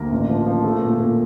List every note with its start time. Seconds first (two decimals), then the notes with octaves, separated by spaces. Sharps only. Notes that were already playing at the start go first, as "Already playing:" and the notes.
Already playing: D2 A#3 A#4
0.12 A1
0.29 F3
0.47 F3
0.64 A3
0.81 A#2
0.99 A#2